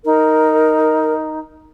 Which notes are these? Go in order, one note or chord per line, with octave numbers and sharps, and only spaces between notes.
D#4 A#4